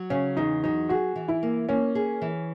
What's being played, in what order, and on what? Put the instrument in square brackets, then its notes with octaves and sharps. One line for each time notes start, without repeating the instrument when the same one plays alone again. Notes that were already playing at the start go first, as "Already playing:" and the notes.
Already playing: [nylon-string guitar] F#3
[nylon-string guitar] C#3 [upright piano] C#4
[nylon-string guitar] E2 [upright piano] D#4
[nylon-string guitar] F#3 [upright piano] D#4
[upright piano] F#4 [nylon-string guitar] G#4
[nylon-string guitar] E3
[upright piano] E4
[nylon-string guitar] A#3
[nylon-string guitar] A#3 [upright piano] C#4
[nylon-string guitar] G#4
E3